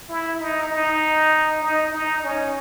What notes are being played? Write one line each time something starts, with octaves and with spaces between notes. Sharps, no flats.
E4
D#4
D#4
D#4
D#4
C#4